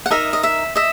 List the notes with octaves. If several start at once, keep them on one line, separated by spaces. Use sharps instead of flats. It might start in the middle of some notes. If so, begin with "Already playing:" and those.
F#5
D#4 A#4 D#5 E5
D#5
E5
D#5 E5